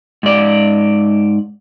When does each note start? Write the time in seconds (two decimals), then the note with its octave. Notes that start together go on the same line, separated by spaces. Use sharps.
0.23 G#2 D5